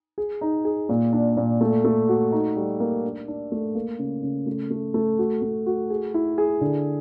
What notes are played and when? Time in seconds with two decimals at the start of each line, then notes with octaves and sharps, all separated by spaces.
0.18 G#4
0.41 D#4
0.65 G#4
0.89 A#2
1.13 D4
1.37 A#2
1.61 A3
1.85 A3
2.09 F#4
2.32 D#4
2.56 G3
2.80 A#3
3.04 D4
3.28 D4
3.52 A3
3.75 A#3
3.99 C#3
4.23 C#3
4.47 A3
4.71 A3
4.94 A3
5.19 F#4
5.42 A3
5.66 F#4
5.90 G#4
6.14 E4
6.38 G#4
6.61 D3